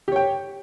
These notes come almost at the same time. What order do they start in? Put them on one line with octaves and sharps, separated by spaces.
G4 C#5 G5